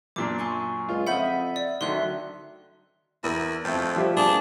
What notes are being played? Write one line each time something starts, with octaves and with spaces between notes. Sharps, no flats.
F#2 A#2 D4 D6
G#5 C6 C#6
C#2 F4
F2 D#5 E5 F#5 B5 G6
D5
D2 D3 D#3 F#3 E5 C6 F#6
E2 A#4
F2 A3 C4
F3 G3 E5
A#3 B3 D4 G#4